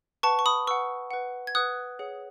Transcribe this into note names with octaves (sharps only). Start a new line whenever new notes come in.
B4 F#5 A5 C#6
C#6
B5 D#6
B4 F#5 C#6 E6
B4 F#5
G#6
B4 F#5 D#6 F#6
G#4 C#5 F#5